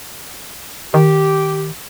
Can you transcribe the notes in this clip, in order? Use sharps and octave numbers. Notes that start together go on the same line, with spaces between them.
D#3 G4